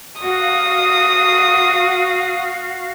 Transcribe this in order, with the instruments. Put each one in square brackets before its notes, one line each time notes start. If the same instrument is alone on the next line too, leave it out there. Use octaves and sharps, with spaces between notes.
[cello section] F#4 F5 [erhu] D#6